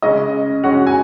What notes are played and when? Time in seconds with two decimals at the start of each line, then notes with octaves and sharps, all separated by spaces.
0.02 C#3 G#3 C#4 D#5
0.63 C#3 G#3 C#4 F#4 F#5
0.87 G#5